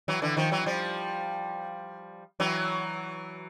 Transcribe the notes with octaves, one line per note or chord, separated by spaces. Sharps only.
E3 F#3
D3 E3
D#3 F3
E3 F#3
F3 G3
E3 F#3